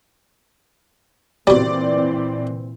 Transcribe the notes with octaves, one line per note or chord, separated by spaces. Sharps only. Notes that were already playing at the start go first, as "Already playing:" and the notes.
A#2 E3 F#3 G3 C4 D5